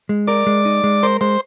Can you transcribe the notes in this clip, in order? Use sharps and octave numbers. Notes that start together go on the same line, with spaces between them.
G#3
A#4 D5
G#3
D#4
G#3
A#4 C5
G#3 C5